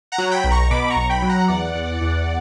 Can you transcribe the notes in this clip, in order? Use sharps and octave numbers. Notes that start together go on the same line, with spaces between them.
F#5 A#5
F#3
G5 B5
B1
A#5 C#6
B2 B5 D6
A#5 C#6
B1
G5 B5
F#3
F#5 A#5
E2 D5 F#5
E2
E2